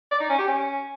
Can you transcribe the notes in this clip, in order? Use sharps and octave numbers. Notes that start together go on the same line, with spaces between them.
D5
D#4
C#4
G4
C#4